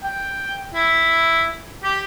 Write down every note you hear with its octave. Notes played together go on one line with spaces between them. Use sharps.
G5
E4
G4